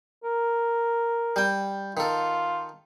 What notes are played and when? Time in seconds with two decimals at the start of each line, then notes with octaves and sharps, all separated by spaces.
0.24 A#4
1.36 G3 G5
1.97 D#3 F4 A4